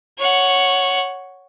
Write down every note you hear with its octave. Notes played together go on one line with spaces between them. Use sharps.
C#5 F#5